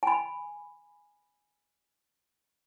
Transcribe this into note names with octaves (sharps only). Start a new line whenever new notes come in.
G#5 B5